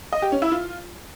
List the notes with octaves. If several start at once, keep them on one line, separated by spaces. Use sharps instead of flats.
D#5
G4
C#4
E4
F4